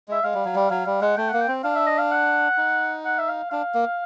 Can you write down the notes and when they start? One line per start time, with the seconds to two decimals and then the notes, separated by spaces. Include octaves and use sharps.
0.08 G#3 E5
0.24 G#3 F5
0.34 G3
0.45 F#3
0.55 G3
0.70 F#3 F5
0.86 G3 F5
1.01 G#3 F#5
1.17 A3 G5
1.28 A#3 F#5
1.41 G5
1.48 C4
1.64 D4 F5
1.76 E5
1.87 D#5
1.99 F5
2.11 F#5
2.57 D#4
3.05 F#5
3.19 E5
3.29 F5
3.51 D4 F5
3.74 A#3